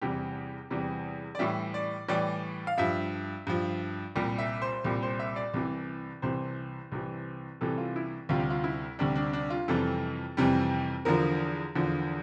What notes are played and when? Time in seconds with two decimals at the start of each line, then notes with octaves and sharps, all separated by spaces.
0.01 E2 C3 E3 G3 G4
0.70 E2 C3 E3 G3
1.35 D5
1.39 A2 E3 G3 E5
1.74 D5
2.09 A2 E3 G3 D5
2.67 F5
2.78 G2 F3 E5
3.47 G2 F3
4.15 C2 A#2 G3
4.38 E5
4.62 C5
4.84 C2 A#2 G3
5.02 C5
5.19 E5
5.36 D5
5.54 C2 C3 E3
6.22 C2 C3 E3 C5
6.92 C2 C3 E3
7.61 C2 C3 E3 A4
7.78 F4
7.96 E4
8.29 D2 C3 G3 F4
8.40 G4
8.50 F4
8.64 E4
8.99 D2 C3 G3 D4
9.15 D4
9.33 D4
9.50 F4
9.68 F2 C3 E3 G3 A4
10.37 F2 C3 E3 G3
11.05 E2 D3 F3 A#4
11.75 E2 D3 F3